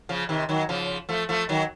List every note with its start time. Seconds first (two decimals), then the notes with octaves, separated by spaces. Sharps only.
0.09 C#3 F3
0.29 C3 D#3
0.49 D#3 F#3
0.69 C#3 F3
1.09 F3 A3
1.29 F3 A3
1.49 D#3 F#3